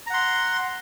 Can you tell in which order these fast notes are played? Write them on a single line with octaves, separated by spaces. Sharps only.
A#5 F#5 C6